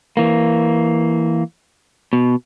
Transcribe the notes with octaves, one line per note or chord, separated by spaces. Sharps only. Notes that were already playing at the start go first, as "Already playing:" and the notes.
E3 A#3
B2